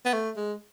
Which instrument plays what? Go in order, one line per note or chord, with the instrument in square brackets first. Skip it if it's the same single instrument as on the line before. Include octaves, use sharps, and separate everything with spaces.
[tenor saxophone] B3
A3
G#3